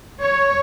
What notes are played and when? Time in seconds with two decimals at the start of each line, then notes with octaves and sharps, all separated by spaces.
0.21 C#5